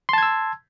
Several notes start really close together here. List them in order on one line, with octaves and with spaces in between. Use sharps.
C6 A5 G#6 E6